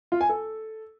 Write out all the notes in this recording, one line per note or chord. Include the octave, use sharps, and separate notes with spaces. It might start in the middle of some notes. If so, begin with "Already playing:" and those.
F4
G#5
A4